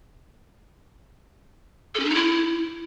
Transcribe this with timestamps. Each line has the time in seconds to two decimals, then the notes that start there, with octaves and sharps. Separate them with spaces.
1.95 A4
2.00 C#4
2.05 D4
2.10 D#4
2.15 E4